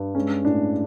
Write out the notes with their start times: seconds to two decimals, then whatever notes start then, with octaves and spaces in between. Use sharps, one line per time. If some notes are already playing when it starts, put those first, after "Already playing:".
Already playing: G2
0.15 G#3 C#4
0.45 A2 D4